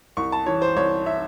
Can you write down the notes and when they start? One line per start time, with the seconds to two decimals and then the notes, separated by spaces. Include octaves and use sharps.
0.17 C2 C#6
0.32 A5
0.46 E3 C#5
0.62 C5
0.76 C2 C#5
1.06 E5